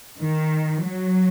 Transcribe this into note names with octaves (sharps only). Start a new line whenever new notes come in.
D#3
F#3